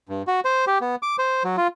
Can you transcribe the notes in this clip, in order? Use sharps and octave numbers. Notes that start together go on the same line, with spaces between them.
G2
F#4
C5
G4
B3
D6
C5
F#3
F4